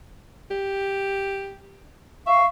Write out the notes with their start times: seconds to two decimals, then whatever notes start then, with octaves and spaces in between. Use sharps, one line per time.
0.51 G4
2.27 E5 F5 C#6